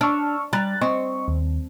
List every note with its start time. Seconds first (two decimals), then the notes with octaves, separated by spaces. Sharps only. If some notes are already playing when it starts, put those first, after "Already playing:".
0.01 D4 C#6 E6 F6
0.53 G3 A#5 F#6 A6
0.81 C4 D#5 C#6
1.28 D#2